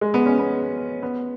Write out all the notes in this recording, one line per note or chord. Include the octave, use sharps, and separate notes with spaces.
G#3
B3
C#4
B3
B3